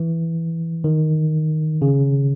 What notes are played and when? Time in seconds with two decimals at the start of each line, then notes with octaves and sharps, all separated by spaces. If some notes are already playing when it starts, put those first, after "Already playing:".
Already playing: E3
0.84 D#3
1.82 C#3